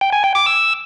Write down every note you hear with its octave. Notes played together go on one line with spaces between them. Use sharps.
G5
G#5
G5
D6
E6